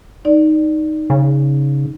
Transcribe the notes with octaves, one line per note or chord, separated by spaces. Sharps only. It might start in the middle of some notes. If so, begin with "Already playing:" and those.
D#4 D5
C#3